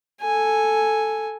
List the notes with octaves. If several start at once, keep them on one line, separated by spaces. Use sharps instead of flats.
A4 G#5